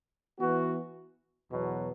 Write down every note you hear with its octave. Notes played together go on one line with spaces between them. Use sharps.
E3 B3 F#4
E2 B2 F#3